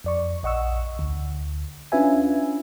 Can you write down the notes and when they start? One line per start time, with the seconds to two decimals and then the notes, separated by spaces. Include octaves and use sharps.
0.04 F2 D5 C#6
0.43 A#1 D#5 F#5 C#6 E6
0.99 D2
1.92 C#4 D4 F4 B4 E5 G#5